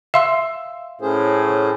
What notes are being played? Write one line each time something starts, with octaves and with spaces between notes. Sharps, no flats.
E5 F5 C6 E6
A2 C#4 G#4 C5